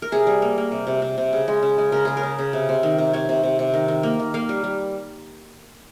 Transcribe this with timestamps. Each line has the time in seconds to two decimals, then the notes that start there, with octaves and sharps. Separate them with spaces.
0.02 A#4
0.12 C3 G#4
0.27 G3
0.42 A#3
0.58 A#3
0.71 C3
0.87 C3
1.02 C3
1.18 C3
1.33 C#3
1.48 G#3
1.63 C#3
1.78 G#3
1.92 C#3 A#4
2.05 C#3 G#4
2.17 A#4
2.23 C#3
2.39 C#3
2.53 C3
2.69 C3
2.83 D#3
2.98 C3
3.13 C3 C#5
3.29 C3
3.43 C3
3.59 C3
3.74 D#3
3.88 D#3
4.03 A#3
4.20 D#3
4.34 A#3 F5
4.49 G3
4.64 G3